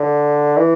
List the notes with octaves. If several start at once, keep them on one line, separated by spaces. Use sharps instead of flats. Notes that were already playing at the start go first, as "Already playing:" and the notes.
Already playing: D3
E3